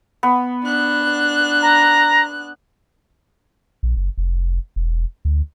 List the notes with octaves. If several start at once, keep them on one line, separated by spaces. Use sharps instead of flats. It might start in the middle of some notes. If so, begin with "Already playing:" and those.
B3
D4 F#6
A#5
A#1
F#1
F1
E1
D2